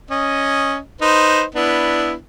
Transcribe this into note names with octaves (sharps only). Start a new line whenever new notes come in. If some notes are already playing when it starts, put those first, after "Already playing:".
C#4 D#5
D#4 B4 C5
B3 D4 E4